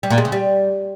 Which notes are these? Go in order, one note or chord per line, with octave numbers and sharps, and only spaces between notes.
G3
A#2
G#3
C#3
G3